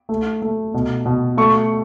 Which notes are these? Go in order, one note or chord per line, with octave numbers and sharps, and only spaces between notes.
A3
A3
B2
B2
A3 C#6